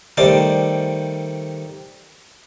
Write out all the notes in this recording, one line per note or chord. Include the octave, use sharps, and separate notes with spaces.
D#3 G3 A3 C5 D5 A5